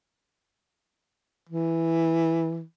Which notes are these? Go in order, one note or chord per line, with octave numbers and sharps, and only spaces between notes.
E3